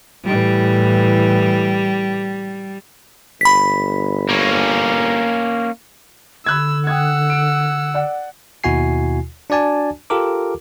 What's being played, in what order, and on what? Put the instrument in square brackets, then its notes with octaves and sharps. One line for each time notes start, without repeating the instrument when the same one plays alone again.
[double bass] A2 E3 [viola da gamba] G3
[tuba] G1 [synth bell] B5 B6
[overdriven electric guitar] A#3 C#4
[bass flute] D3 [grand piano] B5 F#6 G#6 [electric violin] E6
[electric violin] F#5 E6 [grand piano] G5 D#6 G#6
[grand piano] D7
D5 F#5
[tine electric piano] D#2 B2 E4 F#4 G#5 C7
D4 F#4 D5 G#5 A5
F4 G4 A4 A#4 D6